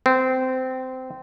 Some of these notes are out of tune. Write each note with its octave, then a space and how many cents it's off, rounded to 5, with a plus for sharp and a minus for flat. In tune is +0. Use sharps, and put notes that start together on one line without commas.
C4 -20